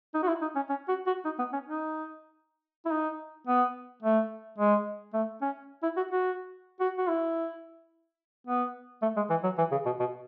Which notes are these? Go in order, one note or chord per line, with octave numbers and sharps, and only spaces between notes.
D#4
F#4
E4
D#4
C#4
C#4
F#4
F#4
D#4
B3
C#4
D#4
E4
D#4
B3
A3
G#3
A3
C#4
E4
F#4
F#4
F#4
F#4
E4
B3
A3
G#3
E3
F#3
E3
C#3
B2
B2